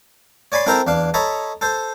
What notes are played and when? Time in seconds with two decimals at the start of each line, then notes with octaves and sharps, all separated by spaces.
0.52 C#5 D5 G#5 B5 C6
0.66 C4 E4 A4 A#4 C5 A#5
0.87 E2 D4 F5
1.14 A4 C#5 D#5 A#5 B5
1.61 A4 C5